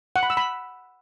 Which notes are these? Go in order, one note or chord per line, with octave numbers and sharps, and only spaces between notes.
F#5
B5
E6
B5